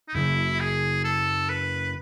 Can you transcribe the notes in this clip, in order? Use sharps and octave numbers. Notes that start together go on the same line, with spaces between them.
D#4
F#2 C#3 F#3 E4
G#4
A4
B4